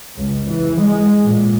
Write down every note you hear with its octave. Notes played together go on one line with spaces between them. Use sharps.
C#2
E3
G#3
A#2